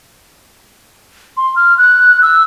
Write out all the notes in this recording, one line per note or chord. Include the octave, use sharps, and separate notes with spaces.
C6
F6
F#6
E6